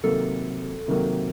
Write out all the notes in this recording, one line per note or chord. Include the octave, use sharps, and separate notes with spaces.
C3 D#3 F#3 A#3 A4
C3 D#3 F#3 A#3